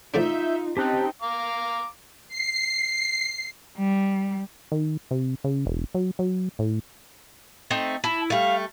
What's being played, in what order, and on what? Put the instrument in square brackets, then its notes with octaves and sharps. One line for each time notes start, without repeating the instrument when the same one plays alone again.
[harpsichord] F3 A3 D4 [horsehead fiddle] D#4 F4 [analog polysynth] E5 G6
[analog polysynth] C4 D#4 [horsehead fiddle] C#4 G5 [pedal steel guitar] G4 A5 F#6
[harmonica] F5 A#5 D6
[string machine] C7
[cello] G3
[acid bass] D#3
C3
C#3
E1
F#3
F#3
A2
[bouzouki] A3 C4 D#4
[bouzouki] E4 [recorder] A5
[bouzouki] G3 A3 [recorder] F5